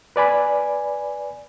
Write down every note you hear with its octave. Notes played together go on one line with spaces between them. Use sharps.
B4 D5 G#5 B5